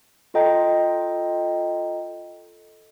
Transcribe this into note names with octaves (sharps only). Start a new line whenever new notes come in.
F4 A4 D#5 G5 A#5